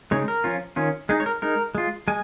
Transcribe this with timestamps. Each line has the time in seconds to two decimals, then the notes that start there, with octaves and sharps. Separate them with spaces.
0.11 C#3 G#3 D#4 C#5
0.28 A#4
0.44 F3 C#4 F4
0.76 D#3 C#4 F4
1.09 G#3 D#4 G#4
1.20 C#5
1.26 A#4
1.42 G#3 D#4 A#4
1.75 G#3 F4
2.08 G#3 G#5